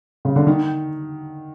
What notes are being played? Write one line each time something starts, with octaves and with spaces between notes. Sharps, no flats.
C#3
D3
D#3